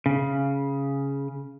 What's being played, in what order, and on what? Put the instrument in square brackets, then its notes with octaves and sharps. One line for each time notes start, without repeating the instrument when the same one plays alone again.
[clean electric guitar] C#3